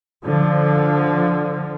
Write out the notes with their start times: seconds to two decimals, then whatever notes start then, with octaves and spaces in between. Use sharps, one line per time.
0.25 D3 F3